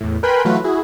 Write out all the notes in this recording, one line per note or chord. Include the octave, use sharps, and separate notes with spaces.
E2 A2
A#4 B4 G5 G#5 B5 C6
E3 F#3 A3 F4 F#4 B4
E4 F#4 G#4